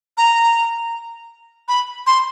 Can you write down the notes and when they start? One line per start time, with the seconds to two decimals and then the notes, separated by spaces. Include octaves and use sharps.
0.17 A#5
1.68 B5
2.07 C6